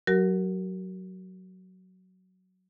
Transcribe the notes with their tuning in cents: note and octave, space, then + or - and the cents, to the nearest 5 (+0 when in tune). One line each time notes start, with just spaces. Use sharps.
F#3 +0 F#4 +40 A#4 +0